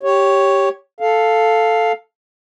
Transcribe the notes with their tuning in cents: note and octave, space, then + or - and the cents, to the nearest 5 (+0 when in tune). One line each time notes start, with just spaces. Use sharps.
G4 +0 C#5 +0
A4 +0 F5 +0